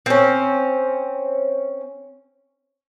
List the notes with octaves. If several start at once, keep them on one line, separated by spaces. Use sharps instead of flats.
C4 C#4